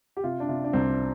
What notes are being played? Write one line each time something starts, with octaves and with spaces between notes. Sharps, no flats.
G4
C3 F4
D4
C3 F4
D4
C2 C4